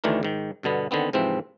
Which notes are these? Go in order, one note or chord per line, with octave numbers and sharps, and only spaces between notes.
D2 D#3 E3 A3 D4 A#4
G#2 D#3
G2 B2 D3 B3
D3 D#3 B3 C4
G#2 C3 E3 F3 C4